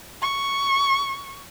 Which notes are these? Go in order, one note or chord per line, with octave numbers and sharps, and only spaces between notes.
C#6